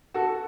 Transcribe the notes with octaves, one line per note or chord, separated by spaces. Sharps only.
F#4 A4